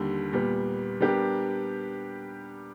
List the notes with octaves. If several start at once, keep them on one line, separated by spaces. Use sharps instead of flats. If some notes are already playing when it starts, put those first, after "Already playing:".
Already playing: D#2 D3 G3
A#2 G3 B3
G3 B3 D4 G4 A#4